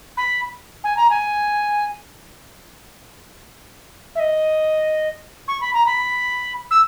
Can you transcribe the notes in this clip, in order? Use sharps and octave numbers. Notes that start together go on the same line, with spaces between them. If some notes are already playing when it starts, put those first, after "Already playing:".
B5
G#5
A#5
G#5
E5
D#5
C#6
B5
A#5
B5
E6